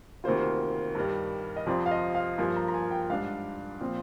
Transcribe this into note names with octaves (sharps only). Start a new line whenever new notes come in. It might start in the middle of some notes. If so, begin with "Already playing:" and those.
D2 C3 D#3 A#3 F4 C5
G2 D#3 G3
D#5
F2 C3 F3 C4 D5
F5
D#5
F5
G2 F3 A#3 F4 G#5
A#5
A#5
G#5
G5
G#2 G3 D4 F5
A#2 F3 C4